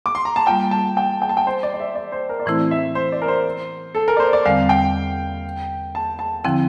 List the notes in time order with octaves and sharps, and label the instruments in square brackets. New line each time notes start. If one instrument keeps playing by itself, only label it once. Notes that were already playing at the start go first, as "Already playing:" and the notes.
[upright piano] D6
C6
A#5
A5
[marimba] G3 A#3 F4 [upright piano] G5
[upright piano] A5
G5
G5
A5
G5
C5
D5
D5
E5
D5
C5
A#4
D5
[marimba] A2 E3 A3 C4 E4 [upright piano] C5
[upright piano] E5
C5
D5
A#4
C5
A4
A#4
D5
C5
D5
[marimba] E2 D3 G3 C4 [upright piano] F5
[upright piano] G5
A5
A5
[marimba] D3 F3 C4 E4 [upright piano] G5